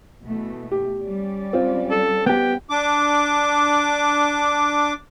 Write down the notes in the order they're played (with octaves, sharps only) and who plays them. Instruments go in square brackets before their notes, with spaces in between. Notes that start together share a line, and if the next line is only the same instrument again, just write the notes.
[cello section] B2 E3 A3
[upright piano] G4
[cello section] G3 C#4 D5
[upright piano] C4 F4
[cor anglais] A4
[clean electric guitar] B3 G4 [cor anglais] G5
[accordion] D4 D6